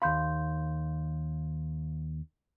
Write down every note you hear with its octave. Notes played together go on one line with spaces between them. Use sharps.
D#2 F5 B5 C6 G6